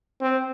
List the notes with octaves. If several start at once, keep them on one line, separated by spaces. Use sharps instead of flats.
C4